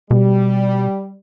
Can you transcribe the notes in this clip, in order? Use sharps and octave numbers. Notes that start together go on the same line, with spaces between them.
B2 G3